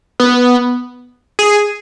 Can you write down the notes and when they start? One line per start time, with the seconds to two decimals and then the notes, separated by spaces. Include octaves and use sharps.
0.20 B3
1.39 G#4